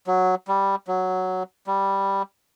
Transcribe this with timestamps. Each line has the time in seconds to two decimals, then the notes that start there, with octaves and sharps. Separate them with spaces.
0.07 F#3
0.48 G3
0.88 F#3
1.67 G3